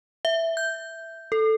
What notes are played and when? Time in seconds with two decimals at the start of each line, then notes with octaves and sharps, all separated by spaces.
0.25 E5
0.57 G6
1.32 A4